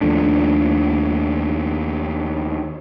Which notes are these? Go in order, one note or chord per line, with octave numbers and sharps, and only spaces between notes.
D#2 F3 A3 D4